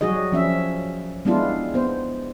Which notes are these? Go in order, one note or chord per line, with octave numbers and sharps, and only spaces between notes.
F#3 G3 F#4 G#4 D#5
F3 C#4 E5
G3 G#3 B3 D4 E4 F4
B3 C5